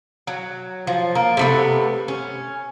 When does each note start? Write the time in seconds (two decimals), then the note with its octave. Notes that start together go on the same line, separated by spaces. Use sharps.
0.27 F#3
0.87 F3
1.15 A#3
1.37 C3 A3 B3
2.08 C#4